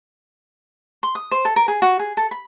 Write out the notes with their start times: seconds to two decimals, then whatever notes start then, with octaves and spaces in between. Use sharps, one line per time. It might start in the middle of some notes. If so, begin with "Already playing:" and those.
1.03 C6
1.15 D#6
1.31 C5
1.45 A4
1.56 A#4
1.68 G#4
1.82 F#4
1.99 G#4
2.17 A4
2.31 B5